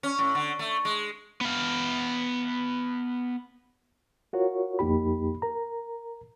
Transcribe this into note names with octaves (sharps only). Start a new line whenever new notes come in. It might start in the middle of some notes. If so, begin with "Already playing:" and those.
C#4
A2
D3
A3
G#3
B3 F5
F4 F#4 A#4 C#5
F2 A#3 D#4 G4 B5
A#4 A#5